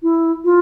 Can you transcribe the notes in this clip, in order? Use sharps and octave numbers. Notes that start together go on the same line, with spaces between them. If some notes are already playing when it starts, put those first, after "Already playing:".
E4
F4